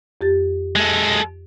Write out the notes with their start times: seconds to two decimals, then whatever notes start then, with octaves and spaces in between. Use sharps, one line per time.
0.21 F2 G4 A6
0.76 G#3 A4